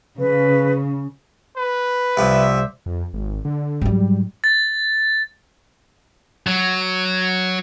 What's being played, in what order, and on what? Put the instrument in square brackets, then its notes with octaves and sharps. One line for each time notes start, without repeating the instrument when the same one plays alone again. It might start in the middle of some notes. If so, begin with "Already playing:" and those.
[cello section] C#3 [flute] B4
[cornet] B4
[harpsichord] C2 F3 [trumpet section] C5 D5 E5
[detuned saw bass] F2
G#1
D3
[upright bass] G#2 F#3 [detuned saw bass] G3
[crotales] A6
[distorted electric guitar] F#3